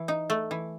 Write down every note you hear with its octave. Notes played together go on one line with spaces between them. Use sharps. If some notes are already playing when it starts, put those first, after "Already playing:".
Already playing: E3
D#4
A3
E3